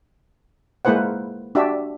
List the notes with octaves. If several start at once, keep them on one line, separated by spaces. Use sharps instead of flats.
G#3 A#3 E4 B4 C5 F#5
D4 F#4 G4 E5